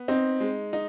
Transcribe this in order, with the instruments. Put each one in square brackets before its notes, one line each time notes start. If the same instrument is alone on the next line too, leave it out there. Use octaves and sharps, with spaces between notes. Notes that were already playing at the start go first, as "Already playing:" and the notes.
Already playing: [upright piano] B3
[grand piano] C4 [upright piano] D#4
[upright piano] G#3
D#4